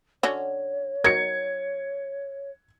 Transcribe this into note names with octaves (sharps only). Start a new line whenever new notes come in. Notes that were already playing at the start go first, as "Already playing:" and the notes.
D3 C#4 F#4 C#5
F#3 D#4 A#4 G#6 C#7